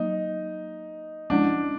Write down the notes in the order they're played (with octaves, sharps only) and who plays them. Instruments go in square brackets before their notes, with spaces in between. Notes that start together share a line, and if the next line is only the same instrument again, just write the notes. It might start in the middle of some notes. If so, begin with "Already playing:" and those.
Already playing: [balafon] F#3 A#3 [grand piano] D#4
[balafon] F3 G#3 C#4 E4 [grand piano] D4